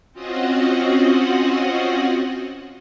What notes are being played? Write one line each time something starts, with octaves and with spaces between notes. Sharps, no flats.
C4 C#4 F4 F#4 D#5 F#5